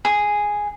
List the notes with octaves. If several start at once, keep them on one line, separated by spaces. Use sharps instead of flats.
G#4